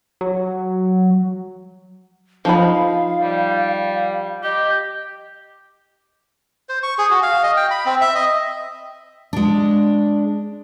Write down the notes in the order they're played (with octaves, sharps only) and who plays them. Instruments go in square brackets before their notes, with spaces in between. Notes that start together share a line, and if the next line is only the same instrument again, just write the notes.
[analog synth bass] F#3
[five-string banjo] F3 D#4 B5 [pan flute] F5
[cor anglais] G3
[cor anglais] G4 [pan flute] D#5
[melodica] C5
C#6
G#4
F#4
F5
D#5
G5
B5
C4
E5
D#5
[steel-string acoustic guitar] G#3 D4